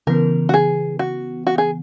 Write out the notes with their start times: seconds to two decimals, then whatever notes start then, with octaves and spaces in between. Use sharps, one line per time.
0.07 C#3 E3 B3 A#4
0.49 F#4
0.54 G#4
0.99 F#4
1.47 F#4
1.58 G#4